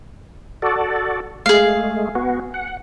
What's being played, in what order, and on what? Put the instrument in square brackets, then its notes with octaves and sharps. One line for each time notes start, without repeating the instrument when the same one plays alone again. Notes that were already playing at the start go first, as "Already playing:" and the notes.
[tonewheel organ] F#4 A4 D5
[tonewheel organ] G#3 A3 [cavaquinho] G#4 F5
[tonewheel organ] B3 F#4
F#5